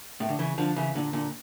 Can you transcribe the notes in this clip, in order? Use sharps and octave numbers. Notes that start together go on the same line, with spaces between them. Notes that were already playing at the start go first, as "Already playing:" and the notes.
A2
D3
C#3 E3
D3 F3
C#3 E3
A#2 D3
A#2 D3